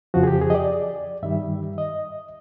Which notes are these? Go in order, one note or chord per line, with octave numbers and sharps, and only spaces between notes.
F2 C#3 F3 F#4
G#4
G4
G#4
D#5
D5
G2 D#3 G3 E5
D#5